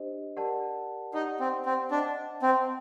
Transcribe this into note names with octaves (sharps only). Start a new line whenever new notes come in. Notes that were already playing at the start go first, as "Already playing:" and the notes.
Already playing: D4 G4 C5 D#5
G4 A#4 D5 F#5 A5
D#4 G4 D5 F#5
C4
C4
D4 C5 D#5 F#5 A5
C4